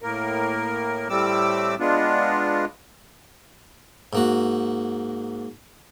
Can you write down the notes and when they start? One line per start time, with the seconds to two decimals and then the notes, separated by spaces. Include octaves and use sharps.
0.02 A2 A#3 A#4
1.09 A2 G3 A3 C4 D6 E6
1.80 G#3 B3 D4 F4
4.13 G#2 A#3 F#4